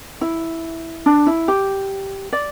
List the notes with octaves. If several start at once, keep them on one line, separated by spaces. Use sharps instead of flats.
E4
D4
E4
G4
D5